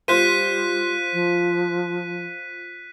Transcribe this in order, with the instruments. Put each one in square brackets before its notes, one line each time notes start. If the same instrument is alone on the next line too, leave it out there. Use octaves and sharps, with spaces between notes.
[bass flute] G3 [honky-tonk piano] F4 C5 [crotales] F#6 B6 D#7
[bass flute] F3